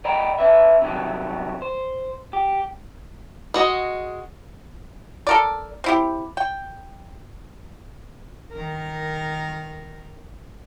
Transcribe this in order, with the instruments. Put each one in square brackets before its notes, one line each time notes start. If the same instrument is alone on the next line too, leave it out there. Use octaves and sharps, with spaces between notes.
[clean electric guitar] D5 D#5 G5 A#5 B5
C#4 B4 E5
C3 D#3 F#3 G3
C5
G4
[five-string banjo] G#3 F#4 D#5
[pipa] A4 A#4 D5
C4 E4 G4
G5
[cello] D#3 A#4